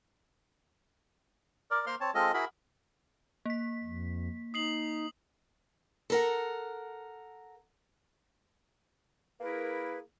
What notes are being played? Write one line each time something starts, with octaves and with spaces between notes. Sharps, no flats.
A#4 D5
A#3 A#4 C5 F5 C6 F6
C4 C#5 A5
G#3 C4 F4 A4 D#5
E4 F#4 G#4 A#4 B5
A#3 B6
F2
D#4 D#6 C7 F#7
A4 A#4 F#5
A#3 E4 G#4 A#4 B4